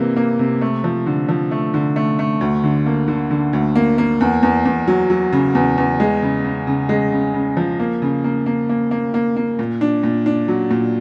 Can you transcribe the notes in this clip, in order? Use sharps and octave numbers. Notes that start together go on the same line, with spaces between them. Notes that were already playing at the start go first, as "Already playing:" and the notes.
Already playing: C3 E3 G3 A#3
A#3
C3
A3
F3
D3
F3
A3
D3
A3
A3
D2
D3
A#3
D3
D3
D2
A#3
A#3
E2
E2
E2
F#3
F#3
C#3
E2
E2
G#3
C#3
C#3
C#3
G#3
C#3
C#3
F3
A#3
C#3
A#3
A#3
A#3
A#3
A#3
A#3
A#2
D4
A#2
D4
F#3
A#2